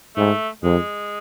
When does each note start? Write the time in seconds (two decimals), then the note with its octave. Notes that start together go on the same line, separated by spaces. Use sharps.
0.16 G#2 A3
0.63 F2 G#3